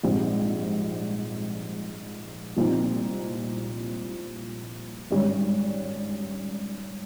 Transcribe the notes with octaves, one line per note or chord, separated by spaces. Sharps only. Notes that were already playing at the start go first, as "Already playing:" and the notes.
A#1 G#2 G3 C4
C2 A#2 F3 C4 D#4
G#1 G2 G3 C#4